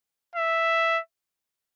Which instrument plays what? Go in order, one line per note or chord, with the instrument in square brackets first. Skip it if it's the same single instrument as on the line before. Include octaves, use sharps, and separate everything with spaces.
[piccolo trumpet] E5